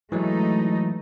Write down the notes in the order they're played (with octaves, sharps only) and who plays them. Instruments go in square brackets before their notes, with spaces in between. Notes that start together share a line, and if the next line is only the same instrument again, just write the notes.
[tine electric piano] E3 F#3 G#3 [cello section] A3 D#4